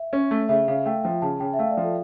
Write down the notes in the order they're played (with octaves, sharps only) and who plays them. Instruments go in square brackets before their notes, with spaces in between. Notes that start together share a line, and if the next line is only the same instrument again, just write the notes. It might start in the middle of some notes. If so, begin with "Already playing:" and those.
Already playing: [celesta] E5
[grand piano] C#4
A3
[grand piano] C#3 [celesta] E5
[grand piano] C#3 [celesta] F5
[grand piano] A3 [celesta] G5
[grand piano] F3 [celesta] G5
[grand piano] C#3 [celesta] A5
[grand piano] C#3 [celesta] G5
[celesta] E5
[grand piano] A3 [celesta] F5
[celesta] D5
[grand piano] F3
[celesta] A4